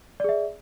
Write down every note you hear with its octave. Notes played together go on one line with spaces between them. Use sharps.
G#4 D5 E5